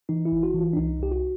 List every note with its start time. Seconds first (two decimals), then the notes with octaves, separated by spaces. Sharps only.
0.09 E3 D#4
0.25 E4
0.32 G#1
0.43 F#4
0.54 E3
0.59 F4
0.73 D4
0.76 C2 D#4
1.00 C2 G4
1.11 F#4